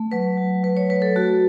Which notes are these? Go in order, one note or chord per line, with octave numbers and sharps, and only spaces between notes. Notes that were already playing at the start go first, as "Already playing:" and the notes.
Already playing: A3
F#3 B4
F#3
F#3 B4
C#5
A3 B4
A4
A3 F#4